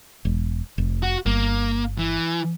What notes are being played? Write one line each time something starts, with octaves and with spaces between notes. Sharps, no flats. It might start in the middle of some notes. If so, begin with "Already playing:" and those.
E1
F1
F#4
G1 A#3
E3